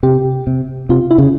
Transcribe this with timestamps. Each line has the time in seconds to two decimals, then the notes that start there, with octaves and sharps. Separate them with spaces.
0.03 C3 G4
0.47 C3
0.89 C3 F4
1.11 E4
1.18 C#3